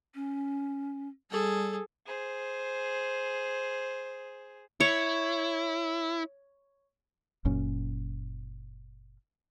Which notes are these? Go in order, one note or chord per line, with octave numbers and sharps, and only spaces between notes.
C#4
G3 G#4 A4
G#4 C5
E4 C#5
F#1 F#2 A#2 C#4